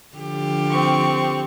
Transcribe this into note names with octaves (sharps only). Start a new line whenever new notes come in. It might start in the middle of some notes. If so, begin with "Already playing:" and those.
D3 F3 G4
C4 C#6